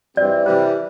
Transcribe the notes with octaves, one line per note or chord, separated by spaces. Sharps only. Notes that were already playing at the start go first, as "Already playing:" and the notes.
G2 E3 C4 D5
C3 E3 G3 C5